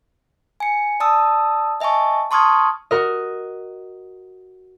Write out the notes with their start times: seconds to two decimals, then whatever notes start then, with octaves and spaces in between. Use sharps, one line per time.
0.60 G#5 C#7
1.00 D5 A5 D#6 E6
1.80 D#5 E5 G#5 A5 C#6
2.31 A5 C6 C#6 D#6 F6 G#6
2.91 F#4 A#4 D#5